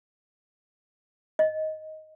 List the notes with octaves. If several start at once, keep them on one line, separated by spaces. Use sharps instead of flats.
D#5